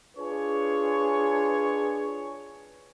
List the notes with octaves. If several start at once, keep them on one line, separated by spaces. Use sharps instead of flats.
D4 F4 G#4 B4 C#5